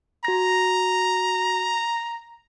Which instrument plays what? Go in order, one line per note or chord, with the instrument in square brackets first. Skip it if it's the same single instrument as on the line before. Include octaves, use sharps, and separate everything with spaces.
[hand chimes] F#4 A#6 [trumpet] A#5